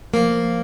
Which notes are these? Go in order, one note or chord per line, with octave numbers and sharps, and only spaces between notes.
F3 A#3